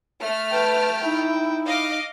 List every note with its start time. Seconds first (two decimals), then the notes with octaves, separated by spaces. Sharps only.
0.21 A3 F6
0.52 B4 G5 A5
1.05 D#4 E4
1.66 D#5 F5 D6